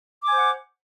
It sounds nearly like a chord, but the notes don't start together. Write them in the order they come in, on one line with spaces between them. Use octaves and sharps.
D6 G#5 C5 F#5